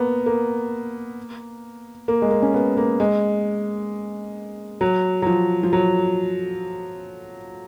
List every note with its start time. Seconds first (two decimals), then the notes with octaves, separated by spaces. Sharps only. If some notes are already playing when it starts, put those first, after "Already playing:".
Already playing: A#3 B3
0.26 A#3
2.08 A#3
2.22 G#3
2.31 A#3
2.42 C#4
2.54 B3
2.77 A#3
3.00 G#3
4.81 F#3
5.22 F#3
5.26 F3
5.63 F3
5.73 F#3